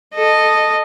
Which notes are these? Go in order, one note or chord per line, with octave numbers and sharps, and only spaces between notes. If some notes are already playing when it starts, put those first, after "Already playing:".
A4 D#5